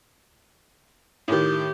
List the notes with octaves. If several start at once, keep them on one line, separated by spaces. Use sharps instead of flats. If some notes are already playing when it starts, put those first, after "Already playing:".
A2 D#3 G4